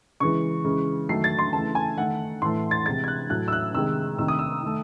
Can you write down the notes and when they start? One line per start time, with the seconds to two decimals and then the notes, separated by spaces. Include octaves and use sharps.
0.20 C#3 E3 G#3 C#6
0.64 C#3 E3 G#3
1.09 D#3 F#3 A3 C7
1.24 A6
1.39 C6
1.53 C#3 E3 A3 A5
1.75 G#5
1.98 D#3 A3 F#5
2.42 A2 E3 A3 C6
2.71 A6
2.86 C3 E3 G#3 A6
3.04 G#6
3.08 F#6
3.30 A2 F#3 A3 F#6
3.48 E6
3.52 F#6
3.75 C3 D#3 G#3 E6
4.18 C3 D#3 A3 E6
4.28 D#6
4.39 E6
4.63 D#3 A3